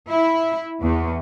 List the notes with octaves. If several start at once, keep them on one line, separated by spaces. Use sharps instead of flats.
E4
E2